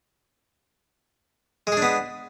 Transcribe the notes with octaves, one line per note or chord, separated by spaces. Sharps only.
G#3 B3 D4 G#4